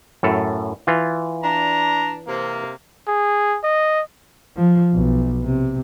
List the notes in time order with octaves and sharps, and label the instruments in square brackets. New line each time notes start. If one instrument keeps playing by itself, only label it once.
[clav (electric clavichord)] F#2 A2 A4
E3 F4
[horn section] D4 A#5
C3 A#3
[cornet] G#4
D#5
[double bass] F3
B1
C3